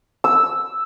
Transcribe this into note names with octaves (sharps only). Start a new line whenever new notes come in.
E6